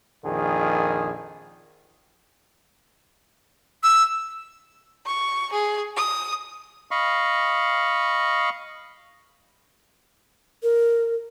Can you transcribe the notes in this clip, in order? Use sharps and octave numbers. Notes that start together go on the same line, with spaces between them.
A#1 F2 D#3 G#4
E6
C#6
G#4
D#6
D#5 F5 B5 C#6
A#4